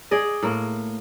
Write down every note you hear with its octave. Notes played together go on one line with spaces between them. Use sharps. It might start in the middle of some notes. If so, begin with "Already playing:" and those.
G#4 D5 D#5
A2 A#3